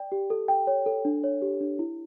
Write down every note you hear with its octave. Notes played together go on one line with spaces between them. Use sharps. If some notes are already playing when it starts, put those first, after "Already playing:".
Already playing: D5 G5
G4
A4
G5
C#5
A4
D4
C#5
G4
D4
E4